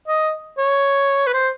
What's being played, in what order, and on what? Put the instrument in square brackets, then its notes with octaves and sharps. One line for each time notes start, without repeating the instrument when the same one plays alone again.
[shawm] D#5
C#5
B4
C5